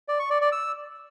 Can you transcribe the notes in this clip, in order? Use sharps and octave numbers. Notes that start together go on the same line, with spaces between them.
D5
C#6
D5
D5
E6